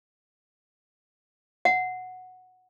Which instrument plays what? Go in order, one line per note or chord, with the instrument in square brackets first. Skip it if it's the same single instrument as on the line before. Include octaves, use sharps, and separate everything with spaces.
[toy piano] F#5